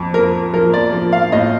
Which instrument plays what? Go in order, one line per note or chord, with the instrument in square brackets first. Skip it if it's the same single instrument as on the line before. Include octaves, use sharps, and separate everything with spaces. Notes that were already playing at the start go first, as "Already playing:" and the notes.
Already playing: [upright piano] F2
F3 A#4
F3 A#4
D5
F3
F5
A2 D#5